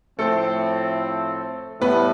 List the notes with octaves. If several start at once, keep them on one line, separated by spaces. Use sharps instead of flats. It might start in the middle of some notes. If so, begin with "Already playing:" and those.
A2 F3 A3 C4 A4
A2 G3 B3 B4